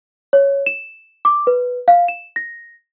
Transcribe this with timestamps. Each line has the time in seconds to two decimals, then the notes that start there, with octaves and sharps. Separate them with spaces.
0.33 C#5
0.66 E7
1.25 D6
1.47 B4
1.88 F5
2.08 E7
2.36 A#6